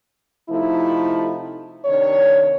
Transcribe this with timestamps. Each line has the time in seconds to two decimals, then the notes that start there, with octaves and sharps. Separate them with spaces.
0.49 C3 F3 A3 D#4 E4
1.86 C3 D#3 D4 C#5